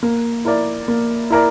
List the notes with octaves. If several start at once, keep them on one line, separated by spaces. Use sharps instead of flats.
A#3
E4 A#4 D5
A#3
E4 A#4 D5